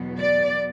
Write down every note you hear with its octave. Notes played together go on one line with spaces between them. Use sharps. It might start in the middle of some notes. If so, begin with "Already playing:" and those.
Already playing: E2 B2 F#3 B3
D5